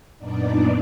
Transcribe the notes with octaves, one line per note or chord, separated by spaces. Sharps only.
F#2 A#2 B3 D4 D#4 D5